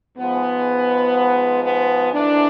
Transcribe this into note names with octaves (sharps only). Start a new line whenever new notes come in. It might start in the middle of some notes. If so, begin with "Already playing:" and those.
G#2 F3 G#3 B3
B3
G#2 E3 A3 D4